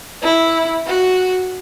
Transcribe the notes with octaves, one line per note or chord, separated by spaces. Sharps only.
E4
F#4